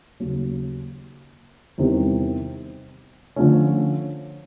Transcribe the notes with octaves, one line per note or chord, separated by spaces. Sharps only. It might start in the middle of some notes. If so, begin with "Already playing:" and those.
D#2 C#3 F#3
E2 C3 D#3 G3 C4
D3 F3 A3 C#4